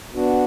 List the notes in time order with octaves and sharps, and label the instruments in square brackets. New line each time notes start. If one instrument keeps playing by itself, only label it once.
[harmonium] B3 D4 F#4